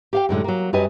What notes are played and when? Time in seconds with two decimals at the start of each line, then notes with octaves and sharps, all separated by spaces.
0.13 G4 F5 G5
0.29 F#2 A2 D3 G#3
0.44 F#3 A#3
0.73 F#2 F#3 G3 B4 D#5 G#5